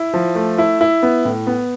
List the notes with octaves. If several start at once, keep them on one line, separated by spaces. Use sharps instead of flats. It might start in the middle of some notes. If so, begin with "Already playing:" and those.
Already playing: E4
F3
A3
E4
E4
B3
A2
B3